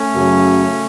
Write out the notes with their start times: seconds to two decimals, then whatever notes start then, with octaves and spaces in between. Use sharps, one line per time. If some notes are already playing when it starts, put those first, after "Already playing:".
Already playing: A3 C#4
0.13 F#2 C#3 F#3